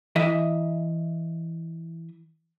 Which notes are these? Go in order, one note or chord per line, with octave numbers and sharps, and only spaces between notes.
E3 D#5 E5